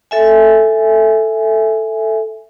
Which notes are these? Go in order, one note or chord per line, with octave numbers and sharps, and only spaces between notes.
A4 E5 G#5